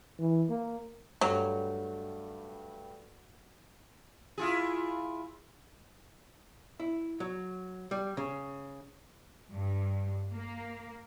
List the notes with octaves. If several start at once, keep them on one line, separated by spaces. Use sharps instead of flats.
E3
A#3
G2 F#3 G3 A3
E4 F4 G#4
E4
F#3
G3
C#3
G2
A#3